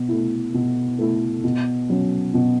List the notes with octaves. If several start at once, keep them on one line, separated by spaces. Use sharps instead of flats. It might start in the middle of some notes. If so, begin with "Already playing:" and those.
Already playing: B2
A3 E4
B2
A3 E4
B2
F#3 C#4
B2